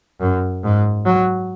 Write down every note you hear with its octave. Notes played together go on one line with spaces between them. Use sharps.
F#2
G#2
F#3